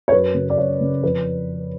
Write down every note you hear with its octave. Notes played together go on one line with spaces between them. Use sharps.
C#5
F#2 B4
C#3
D5
F#2 C#5
C#3
F2 B4